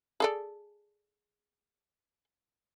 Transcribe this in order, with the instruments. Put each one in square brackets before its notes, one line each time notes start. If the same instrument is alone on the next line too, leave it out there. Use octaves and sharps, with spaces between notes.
[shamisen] G#4 A4 D5